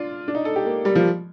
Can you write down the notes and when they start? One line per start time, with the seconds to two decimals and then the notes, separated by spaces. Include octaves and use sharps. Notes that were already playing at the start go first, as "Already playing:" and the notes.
Already playing: D4 F4
0.28 D4
0.35 D#4
0.45 A4
0.56 G4
0.66 A#3
0.85 G3
0.95 F3